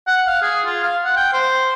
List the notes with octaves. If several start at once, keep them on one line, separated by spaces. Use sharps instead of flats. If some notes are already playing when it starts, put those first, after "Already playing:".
F#5
F5
G#4
F4
F5
F#5
G5
C5